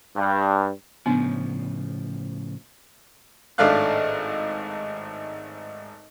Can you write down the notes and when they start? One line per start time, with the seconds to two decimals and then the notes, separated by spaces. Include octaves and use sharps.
0.16 G2
1.06 A2 C#3 F3 B3 D4
3.58 G#1 A2 A3 D4 F5 F#6